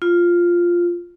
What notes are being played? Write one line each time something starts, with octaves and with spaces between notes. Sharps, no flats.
F4